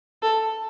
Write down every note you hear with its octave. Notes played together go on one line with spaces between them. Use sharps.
A4